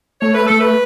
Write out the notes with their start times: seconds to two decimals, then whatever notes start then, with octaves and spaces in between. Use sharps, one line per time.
0.21 A3 C#5
0.34 B4
0.47 A3 A4
0.60 B4